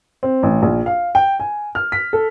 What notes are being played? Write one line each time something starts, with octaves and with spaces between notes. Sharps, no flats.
C4
A1
A#1
F5
G5
G#5
F6
B6
A4